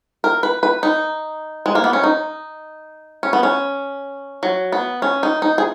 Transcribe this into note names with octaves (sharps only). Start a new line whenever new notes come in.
A#4
B4
B4
D#4
G#3
A#3
B3
C#4
D#4
C#4
B3
C#4
F#3
B3
C#4
D#4
D#4
G#4